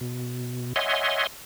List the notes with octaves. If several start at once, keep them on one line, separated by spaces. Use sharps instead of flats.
B2
C#5 D#5 E5 F#5 G#5 C6